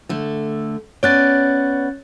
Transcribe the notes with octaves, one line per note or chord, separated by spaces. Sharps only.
D3 A3
B3 C#4 C#5 D5 F#6 A6